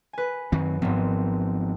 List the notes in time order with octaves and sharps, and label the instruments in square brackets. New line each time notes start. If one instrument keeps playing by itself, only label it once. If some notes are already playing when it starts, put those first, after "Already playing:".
[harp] B4 G#5
[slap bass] F#2 D#3 C4 [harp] F#3
[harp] G#1 G#2 [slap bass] F3 B3 C4